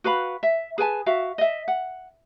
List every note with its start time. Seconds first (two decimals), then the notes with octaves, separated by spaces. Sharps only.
0.04 F#4 B4 F5 B5
0.43 E5
0.78 G#4 B4 G#5 A5
1.06 F#4 E5 F5
1.38 D#5 E5
1.68 F#5